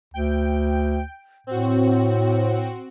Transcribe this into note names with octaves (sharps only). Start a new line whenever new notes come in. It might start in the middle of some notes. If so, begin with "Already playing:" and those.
D2 G5
A2 C4 F#4